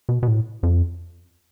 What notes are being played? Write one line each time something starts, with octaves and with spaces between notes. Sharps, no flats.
B2
B2
A2
F2